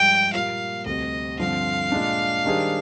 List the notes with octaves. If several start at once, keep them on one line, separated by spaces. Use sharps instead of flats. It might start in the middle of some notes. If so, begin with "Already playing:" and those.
Already playing: G2 F3 G#3 G5
A#2 G3 A#3 F4 F5
D2 C3 G3 C4 D#5
G2 D3 F3 C4 F5
A#2 G#3 D4
D#3 G3 D4 G#4 C5